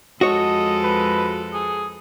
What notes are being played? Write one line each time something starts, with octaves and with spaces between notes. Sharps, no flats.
F2 G#3 F#4 A4 C#5 D#5
B4
G#4